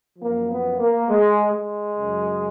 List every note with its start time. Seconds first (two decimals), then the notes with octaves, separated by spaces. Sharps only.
0.19 F#2 F3 A#3
0.48 B3
0.78 A#3
1.09 G#3
1.52 G#3
1.97 F#2 C#3 F#3